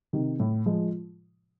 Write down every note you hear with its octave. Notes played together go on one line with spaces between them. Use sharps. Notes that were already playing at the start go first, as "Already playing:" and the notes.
C3 D#3
A2
F3 G#3